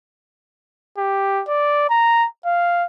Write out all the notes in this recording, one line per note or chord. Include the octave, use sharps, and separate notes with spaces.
G4
D5
A#5
F5